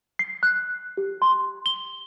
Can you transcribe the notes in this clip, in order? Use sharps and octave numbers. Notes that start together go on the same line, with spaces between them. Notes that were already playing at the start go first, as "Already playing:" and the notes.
C7
F#6
G4
C6
G7